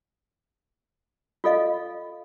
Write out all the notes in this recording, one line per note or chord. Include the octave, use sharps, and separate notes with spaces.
F4 A4 D#5 F5